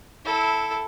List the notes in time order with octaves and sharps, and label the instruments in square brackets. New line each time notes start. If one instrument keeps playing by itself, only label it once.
[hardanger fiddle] E4 A4